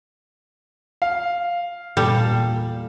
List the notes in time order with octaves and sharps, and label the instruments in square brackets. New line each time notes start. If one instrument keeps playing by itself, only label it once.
[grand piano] F5
[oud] E2 A#2 [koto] G3 [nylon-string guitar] A4